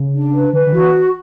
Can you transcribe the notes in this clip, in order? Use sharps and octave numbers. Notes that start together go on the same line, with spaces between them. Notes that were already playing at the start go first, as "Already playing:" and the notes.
Already playing: C#3
D4
B4
D3 B4
D3
E3 F#4